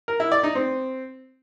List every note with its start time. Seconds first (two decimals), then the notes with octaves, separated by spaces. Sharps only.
0.08 A#4
0.20 E4
0.32 D5
0.43 D#4
0.55 C4